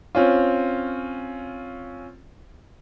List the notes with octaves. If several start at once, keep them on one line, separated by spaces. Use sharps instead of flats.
C4 C#4 F4